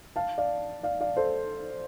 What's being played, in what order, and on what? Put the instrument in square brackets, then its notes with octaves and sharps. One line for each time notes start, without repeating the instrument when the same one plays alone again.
[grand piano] F5 A5
D5 F5
D5 F5
D5 F5
A4 C5